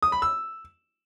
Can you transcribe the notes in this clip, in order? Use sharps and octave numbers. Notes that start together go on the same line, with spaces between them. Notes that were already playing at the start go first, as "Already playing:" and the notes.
D#6
B5
E6